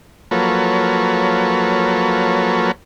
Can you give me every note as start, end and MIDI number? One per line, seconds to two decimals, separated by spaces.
0.31 2.71 53
0.31 2.71 54
0.31 2.71 58
0.31 2.71 69
0.31 2.71 71
0.31 2.71 73